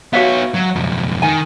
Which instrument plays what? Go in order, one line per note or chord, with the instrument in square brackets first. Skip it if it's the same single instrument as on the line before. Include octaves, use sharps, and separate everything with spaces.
[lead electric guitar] B3 C#5 [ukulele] F#4 E5 F5
[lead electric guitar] F#3
B1 F2
[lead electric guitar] D#3 [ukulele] A#4 G#5